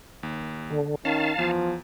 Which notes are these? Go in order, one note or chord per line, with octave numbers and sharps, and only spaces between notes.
D#2
D3
D#3 C#4 F5 A5
E2 F3